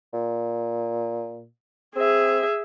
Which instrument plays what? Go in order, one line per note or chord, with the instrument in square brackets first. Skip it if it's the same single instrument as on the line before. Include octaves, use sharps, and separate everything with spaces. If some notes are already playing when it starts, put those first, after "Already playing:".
[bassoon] A#2
[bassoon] C4 [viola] G#4 E5